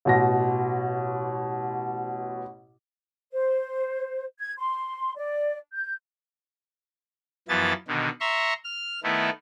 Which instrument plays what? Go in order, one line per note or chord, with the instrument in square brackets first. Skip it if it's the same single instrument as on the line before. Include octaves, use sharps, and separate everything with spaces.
[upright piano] A1 B2 A#6
[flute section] C5
G#6
C6
D5
G6
[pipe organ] F#2 E3 F3 B3 E4 A6
B2 D3 D#3
E5 A#5 C6 C#6
F6
D#3 A3 B3 E4